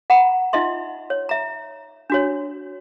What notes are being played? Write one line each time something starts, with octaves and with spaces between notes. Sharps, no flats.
F#5 A#5 B5
D#4 F4 D#5 E5 C6
C#5
E5 A#5
D4 F#4 C#5